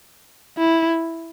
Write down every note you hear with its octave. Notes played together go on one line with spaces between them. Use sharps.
E4